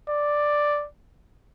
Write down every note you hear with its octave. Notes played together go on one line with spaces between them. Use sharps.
D5